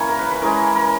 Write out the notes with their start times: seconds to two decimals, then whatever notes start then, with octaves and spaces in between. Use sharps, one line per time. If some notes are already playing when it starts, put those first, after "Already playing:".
Already playing: E3 A#3 C#4 C#5 E5
0.09 A#4
0.19 B4
0.31 B4
0.41 E3 G#3 C#4 A#4
0.76 A#4